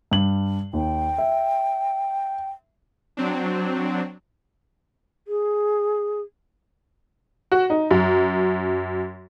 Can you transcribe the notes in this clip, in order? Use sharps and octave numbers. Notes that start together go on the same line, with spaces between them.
G2 F#7
D#2 G5
E5
F#3 C4 D4
G#4
F#4
D#4
F#2